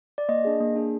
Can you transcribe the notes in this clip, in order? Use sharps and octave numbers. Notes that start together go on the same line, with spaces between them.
D5
A#3 D#5
D4 G#4
A#3
D4 G#4